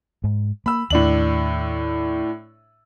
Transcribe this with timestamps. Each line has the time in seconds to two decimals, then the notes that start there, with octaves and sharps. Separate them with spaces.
0.24 G#2
0.66 A#3 B5 E6
0.90 D#2 A2 D4 F#7